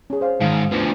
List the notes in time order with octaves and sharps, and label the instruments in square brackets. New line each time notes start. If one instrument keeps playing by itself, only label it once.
[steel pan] C#4 G#4
C5 F5
[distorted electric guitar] G#2 D#3 [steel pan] F5
[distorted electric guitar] D2 F3 [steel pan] B4